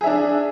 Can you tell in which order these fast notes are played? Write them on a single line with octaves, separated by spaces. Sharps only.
G#4 E5 D4